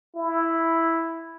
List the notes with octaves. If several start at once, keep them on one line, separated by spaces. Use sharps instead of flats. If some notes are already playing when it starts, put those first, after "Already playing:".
E4